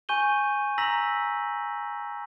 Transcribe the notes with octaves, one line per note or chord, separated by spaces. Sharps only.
G#5 C#6 G6 D#7 G7
A#5 E6 A#6 B6 F#7